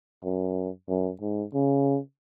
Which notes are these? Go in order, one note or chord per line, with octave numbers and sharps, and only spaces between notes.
F#2
F#2
G#2
C#3